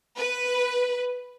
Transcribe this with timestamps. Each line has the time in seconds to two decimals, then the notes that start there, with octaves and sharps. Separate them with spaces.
0.18 B4